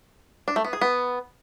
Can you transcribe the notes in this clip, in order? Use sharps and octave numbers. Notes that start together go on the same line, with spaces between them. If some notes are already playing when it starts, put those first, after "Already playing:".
D4
A3
B3
G#4
B3